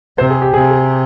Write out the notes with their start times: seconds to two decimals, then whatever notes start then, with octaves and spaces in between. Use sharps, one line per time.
0.18 C3 C5
0.30 G#4
0.42 G4
0.54 C3 G#4
0.71 G#4